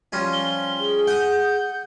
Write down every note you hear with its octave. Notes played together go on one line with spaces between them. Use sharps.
F3 G3 C#4
G7
G#4
F#5 D#6 G6